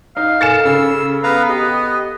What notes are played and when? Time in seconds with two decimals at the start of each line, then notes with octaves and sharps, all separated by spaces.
0.17 D#4 F5
0.41 A4 A#4 G#5 A6 C#7 E7
0.65 C#3 E6
1.23 B3 B4 F5 A#5
1.49 G4 D#5